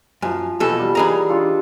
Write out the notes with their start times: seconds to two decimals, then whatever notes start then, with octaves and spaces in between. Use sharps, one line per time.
0.22 F#2 F3 G#5
0.60 E2 B2 A4
0.79 G3
0.95 E3 D#4 G#4 A#4 A#5
1.29 D4 F4 A4